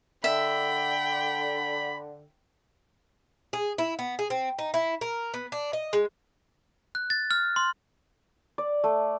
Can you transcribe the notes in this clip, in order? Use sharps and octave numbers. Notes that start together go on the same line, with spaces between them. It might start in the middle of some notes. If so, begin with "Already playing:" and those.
D3 E5 G5 B5
G#4
E4
B3
G#4
C4
D#4
E4
A#4
B3
D4
D#5
G#3
F#6
A6
F6
C6
D5
A3